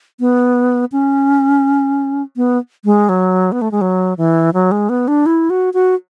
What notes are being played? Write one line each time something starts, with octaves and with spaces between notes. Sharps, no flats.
B3
C#4
B3
G#3
F#3
B3
A3
G#3
F#3
E3
F#3
G#3
B3
D4
E4
F#4
F#4